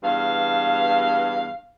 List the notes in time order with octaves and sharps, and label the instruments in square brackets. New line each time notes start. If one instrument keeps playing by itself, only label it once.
[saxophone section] E2 G2 F5